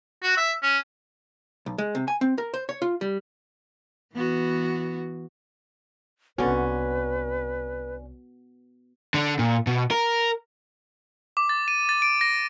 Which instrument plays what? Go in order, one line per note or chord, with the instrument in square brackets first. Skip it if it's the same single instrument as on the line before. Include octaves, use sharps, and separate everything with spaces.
[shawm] F#4
E5
C#4
[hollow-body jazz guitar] B1
G#3
C3
G#5
C4
A#4
C5
C#5
F4
G3
[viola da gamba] E3 B3 F#4
[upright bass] C2 D#3 [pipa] D3 C#4 [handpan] B3 F#4 [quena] B4
[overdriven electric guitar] D3 D4
A#2
B2
A#4
[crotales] D6
A6
D#7
A6
D7
A#6